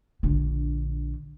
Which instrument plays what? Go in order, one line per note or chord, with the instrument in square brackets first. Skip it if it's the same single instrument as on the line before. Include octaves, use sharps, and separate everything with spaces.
[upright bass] A#1 D3